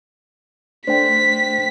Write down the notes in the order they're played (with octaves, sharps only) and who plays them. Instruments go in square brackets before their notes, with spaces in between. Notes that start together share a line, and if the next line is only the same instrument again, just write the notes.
[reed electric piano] A3 D4 [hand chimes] C5 G5 [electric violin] B6